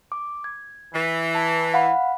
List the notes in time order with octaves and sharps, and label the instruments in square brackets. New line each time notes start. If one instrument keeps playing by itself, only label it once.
[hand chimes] D6
G#6
[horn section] E3
[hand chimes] A5
F5 F#5 B5